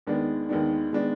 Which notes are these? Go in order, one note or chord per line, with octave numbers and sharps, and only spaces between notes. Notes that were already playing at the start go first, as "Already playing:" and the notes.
D#2 D#3 G#3 B3 D4
D#2 D#3 G#3 B3 D4
D#3 G#3 B3 D4